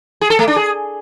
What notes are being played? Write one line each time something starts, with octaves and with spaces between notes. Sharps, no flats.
G#4
A4
A3
D4
G#4